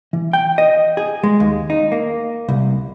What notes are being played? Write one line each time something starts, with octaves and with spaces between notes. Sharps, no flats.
E3
G5
D#5
G#4
G#3
D#2
D#4
A#3
C2